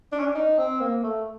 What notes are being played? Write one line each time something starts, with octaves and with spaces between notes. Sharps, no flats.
D4
C#4
D4
D#4
C4
A#3
A3